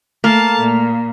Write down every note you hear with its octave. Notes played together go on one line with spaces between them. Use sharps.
A3 A#3 F5 A5 F6
A#2